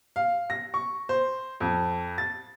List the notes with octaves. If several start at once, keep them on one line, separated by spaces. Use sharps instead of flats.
F5
A#6
C#6
C5
F2
A6